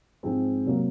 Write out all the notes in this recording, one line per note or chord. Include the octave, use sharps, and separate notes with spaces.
G#2 F3 G#3 C4
C3 F#3 A#3